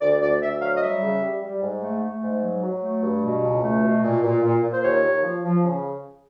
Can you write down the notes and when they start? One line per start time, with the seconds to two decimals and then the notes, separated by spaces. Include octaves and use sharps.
0.01 D2 D5
0.21 D2 D5
0.41 D2 E5
0.61 F#3 F5
0.76 D#5
0.82 G3 E5
1.02 C#3
1.22 G3
1.42 G3
1.62 G#2
1.82 A3
2.02 A3
2.22 G#2
2.42 F#3
2.63 F#3
2.82 A3
3.02 G2
3.23 B2
3.43 C#2
3.62 A3
3.83 B2
4.03 A#2
4.23 A#2
4.42 A#2
4.63 A#2
4.72 C5
4.82 D#2 C#5
5.03 D#2
5.23 F3
5.43 F3
5.63 C#3